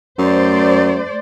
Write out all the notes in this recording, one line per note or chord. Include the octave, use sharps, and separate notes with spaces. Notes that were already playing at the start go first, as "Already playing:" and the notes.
F#2 A3 C5 D5